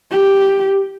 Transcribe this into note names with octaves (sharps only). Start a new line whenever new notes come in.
G4